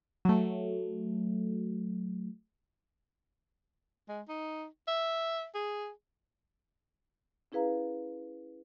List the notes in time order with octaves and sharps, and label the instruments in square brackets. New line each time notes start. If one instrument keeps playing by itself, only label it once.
[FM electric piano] F#3 A3
[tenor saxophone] G#3
D#4
E5
G#4
[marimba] C#4 E4 G#4 B4 F5 A#5